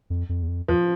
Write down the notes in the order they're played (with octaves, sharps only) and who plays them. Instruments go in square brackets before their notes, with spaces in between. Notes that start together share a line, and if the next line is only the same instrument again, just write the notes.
[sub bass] F2
F2
E2
F2
[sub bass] E2 [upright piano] F3